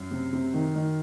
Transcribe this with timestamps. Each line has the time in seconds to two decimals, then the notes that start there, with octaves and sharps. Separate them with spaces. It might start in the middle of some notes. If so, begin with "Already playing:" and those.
Already playing: F#2
0.11 C3
0.33 C3
0.54 D#3
0.76 D#3